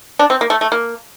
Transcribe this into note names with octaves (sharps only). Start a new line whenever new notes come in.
D4
C4
A#3
A3
A3
A#3